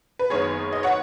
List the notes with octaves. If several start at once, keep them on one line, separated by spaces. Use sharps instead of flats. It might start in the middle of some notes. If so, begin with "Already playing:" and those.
B4
F#1 F#2 D#3 B3 G#4 C#5
D#5
C#5 F#5